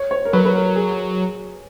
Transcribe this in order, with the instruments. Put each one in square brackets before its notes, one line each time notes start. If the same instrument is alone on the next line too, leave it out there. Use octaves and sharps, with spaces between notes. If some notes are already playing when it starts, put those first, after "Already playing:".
Already playing: [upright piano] C#5
C#5
A#4
[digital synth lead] F#3 [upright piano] B4
[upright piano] B4
A#4
G#4